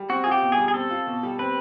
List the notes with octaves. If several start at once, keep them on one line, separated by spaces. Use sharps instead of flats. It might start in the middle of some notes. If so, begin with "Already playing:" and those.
Already playing: G3
C4 F#4
F4 G#4
G4
B2
G#4
G3
G#4
C4 A4
F4
B2
G3
C4 B4